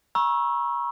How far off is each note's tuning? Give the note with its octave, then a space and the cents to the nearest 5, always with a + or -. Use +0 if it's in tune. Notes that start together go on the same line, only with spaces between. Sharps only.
A#5 +45 C#6 -20 E6 +0